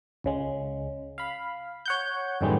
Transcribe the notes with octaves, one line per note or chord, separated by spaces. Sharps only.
C#2 C#3 G#3
F5 B5
C#5 F#5 G6
F#2 A2 D#3 G3 G#3 B3